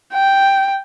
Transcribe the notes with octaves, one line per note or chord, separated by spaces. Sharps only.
G5